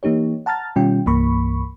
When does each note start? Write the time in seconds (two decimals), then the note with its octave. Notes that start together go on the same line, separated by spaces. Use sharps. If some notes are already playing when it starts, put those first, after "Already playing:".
0.03 E3 A#3 D#4 G4 C#5
0.46 F#5 A5 A#5 F6 A6
0.76 B2 D#3 G3 C#4 F4 G5
1.06 C2 G2 E3 A#3 B5 C#6